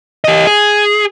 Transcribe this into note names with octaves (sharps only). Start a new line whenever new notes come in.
G4 D#5
G#4